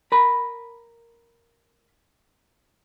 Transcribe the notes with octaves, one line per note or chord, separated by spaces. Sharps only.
A#4 B5